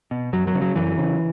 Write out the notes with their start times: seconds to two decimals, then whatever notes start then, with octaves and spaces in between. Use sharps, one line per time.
0.11 B2
0.33 F#2 F#3
0.47 F#3
0.55 C#3
0.61 F#3
0.76 F#2 E3
0.98 C#3